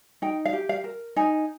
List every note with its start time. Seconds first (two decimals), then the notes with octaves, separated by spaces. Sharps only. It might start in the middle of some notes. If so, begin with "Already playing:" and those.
0.22 D#4 G5
0.45 F5
0.53 G4
0.69 F5
0.84 A#4
1.16 D#4 G#5